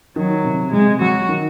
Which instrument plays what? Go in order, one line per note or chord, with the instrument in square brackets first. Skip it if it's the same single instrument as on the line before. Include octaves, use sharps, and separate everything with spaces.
[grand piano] D#3 [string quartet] F#3
[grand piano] C3
[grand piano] C3 [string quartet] G#3
[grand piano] F#3 [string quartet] F#4
[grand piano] D#3